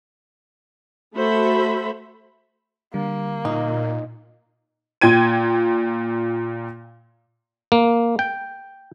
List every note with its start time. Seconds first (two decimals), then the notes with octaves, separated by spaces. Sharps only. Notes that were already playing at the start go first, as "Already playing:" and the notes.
1.15 A3 F#4 A4 C5 E5 B5
2.94 D3 G3 A#3
3.45 A#2 D#4
5.01 A#2 G5 G#6 D#7
7.72 A#3
8.19 G5